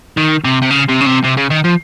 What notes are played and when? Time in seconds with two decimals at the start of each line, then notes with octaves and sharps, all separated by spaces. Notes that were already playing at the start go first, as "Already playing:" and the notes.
0.17 D#3
0.45 C3
0.62 C3
0.71 C#3
0.89 C3
1.01 C#3
1.06 C3
1.24 C3
1.37 C#3
1.50 D#3
1.64 F3